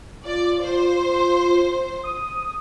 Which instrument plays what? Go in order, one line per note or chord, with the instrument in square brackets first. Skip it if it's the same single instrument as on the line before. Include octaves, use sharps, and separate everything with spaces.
[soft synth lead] F4 [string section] D5
[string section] C5
[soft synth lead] D#6